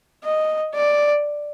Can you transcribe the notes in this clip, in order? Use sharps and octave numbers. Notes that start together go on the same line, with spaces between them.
D#5
D5